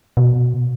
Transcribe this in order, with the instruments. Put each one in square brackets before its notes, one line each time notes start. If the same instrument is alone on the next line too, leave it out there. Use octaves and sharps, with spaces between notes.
[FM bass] B2